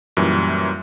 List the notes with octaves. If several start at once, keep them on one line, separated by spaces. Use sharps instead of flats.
F#2 A#2 E3 G3